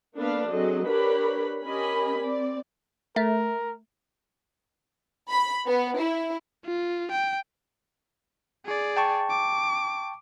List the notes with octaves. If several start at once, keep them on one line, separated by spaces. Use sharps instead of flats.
A#3 B3 D4 A4 B4 F5
F#3 C4 G#4 A4 D#5
D4 G4 A#4 B4 C#5 B5
C#4 G4 A#4 D#5 G#5 B5
C4 D5
A3 A#4
B5
B3
E4
F4
G5
G#4 D5
G5 A5 C#6
D6